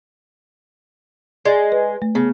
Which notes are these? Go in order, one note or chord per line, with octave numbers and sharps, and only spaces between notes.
G#3 D5 A6
B4
A3
C#3 B3